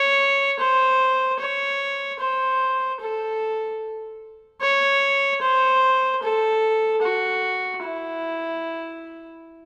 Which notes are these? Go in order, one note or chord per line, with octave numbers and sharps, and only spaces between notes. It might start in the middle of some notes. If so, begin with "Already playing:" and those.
Already playing: C#5
C5
C#5
C5
A4
C#5
C5
A4
F#4
E4